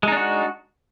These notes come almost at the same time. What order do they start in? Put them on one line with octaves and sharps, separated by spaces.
G#3 D#4 D4 F#4